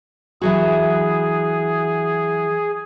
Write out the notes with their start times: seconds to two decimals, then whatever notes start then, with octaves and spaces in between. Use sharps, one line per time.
0.41 E3 F#3 F#4 G#4